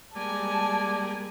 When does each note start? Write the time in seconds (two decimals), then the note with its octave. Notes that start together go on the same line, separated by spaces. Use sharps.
0.16 G3 G#3 A#3 D5 G#5 A5